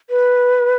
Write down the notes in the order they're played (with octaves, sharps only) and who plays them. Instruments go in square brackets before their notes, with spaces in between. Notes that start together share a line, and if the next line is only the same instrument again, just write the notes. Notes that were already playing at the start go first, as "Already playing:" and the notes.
[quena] B4